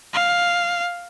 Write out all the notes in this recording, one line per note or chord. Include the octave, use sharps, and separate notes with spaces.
F5